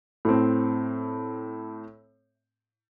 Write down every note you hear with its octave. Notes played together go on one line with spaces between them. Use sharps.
A2 C4